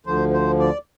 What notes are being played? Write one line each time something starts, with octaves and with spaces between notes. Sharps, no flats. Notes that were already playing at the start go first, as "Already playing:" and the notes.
D2 D3 F3 C5
C5
D5